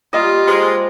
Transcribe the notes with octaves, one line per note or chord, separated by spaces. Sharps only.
G3 A#3 F4 D#5
G#3 C5